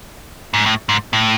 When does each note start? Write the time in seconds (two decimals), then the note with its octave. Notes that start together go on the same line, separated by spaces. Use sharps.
0.54 G#2
0.66 A2
0.89 G#2
1.13 A2